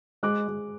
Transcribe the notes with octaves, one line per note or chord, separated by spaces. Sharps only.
G#3 D6 F#6
G#3